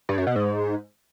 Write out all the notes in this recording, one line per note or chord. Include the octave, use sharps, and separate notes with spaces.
G2
F#2
B2
G#2